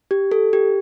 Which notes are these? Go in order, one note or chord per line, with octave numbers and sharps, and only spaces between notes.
G4
A4
G4